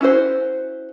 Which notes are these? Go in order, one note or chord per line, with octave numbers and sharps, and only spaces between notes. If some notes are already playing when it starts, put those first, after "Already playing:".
C#4 E4 F#4 C5